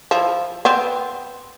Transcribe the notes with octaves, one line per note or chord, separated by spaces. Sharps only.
F3 E4
B3 C4